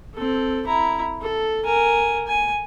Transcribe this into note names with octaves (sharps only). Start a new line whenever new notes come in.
C4 A4
E4 A#5
A4
A#4 G#5
G#5